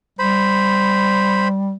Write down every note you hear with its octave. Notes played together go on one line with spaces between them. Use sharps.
G3 C5 B5